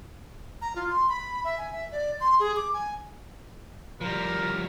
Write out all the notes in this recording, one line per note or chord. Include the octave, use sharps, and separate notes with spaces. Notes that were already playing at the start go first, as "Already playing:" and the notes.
A#5
F4
C6
B5
E5
G#5
E5
D5
C6
G#4
D6
G#5
F3 G3 A#4